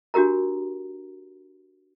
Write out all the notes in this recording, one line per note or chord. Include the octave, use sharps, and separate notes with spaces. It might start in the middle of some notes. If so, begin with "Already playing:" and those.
D4 F#4 G4 A#4 A#5